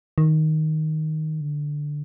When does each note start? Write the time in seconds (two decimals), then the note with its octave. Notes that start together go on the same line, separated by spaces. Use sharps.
0.18 D#3
1.41 D3